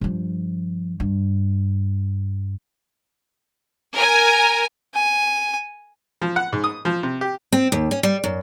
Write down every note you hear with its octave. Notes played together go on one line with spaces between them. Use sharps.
G2 F3
G2
A#4 G#5
G#5
F3
F#5
G#2
D#6
F3
C3
G4
C4
D#2
C#4
G3
F#2